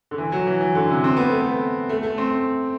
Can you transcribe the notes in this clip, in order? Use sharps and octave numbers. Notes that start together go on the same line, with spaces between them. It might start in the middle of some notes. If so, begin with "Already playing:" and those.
D3
E3
F#3
E3
E3
D3
C3
C4
B3
A3
B3
A3
A3
C4